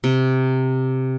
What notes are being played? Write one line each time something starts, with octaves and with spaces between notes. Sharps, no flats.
C3